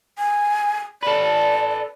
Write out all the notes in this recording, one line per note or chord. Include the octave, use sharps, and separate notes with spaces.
G#5
A4 B4 D5